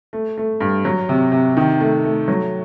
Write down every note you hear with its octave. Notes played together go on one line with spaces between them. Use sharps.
A3
A3
G2
F#3
C3
C3
D#3
A3
A3
F#3